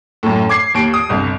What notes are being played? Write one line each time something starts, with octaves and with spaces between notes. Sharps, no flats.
F#2 A2
D6 G#6 C7
D#2 D7
D#6
G1 C2